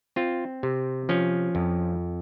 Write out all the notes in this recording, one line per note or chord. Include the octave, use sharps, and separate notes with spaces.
C4 F4
C3
F3 C#4
F2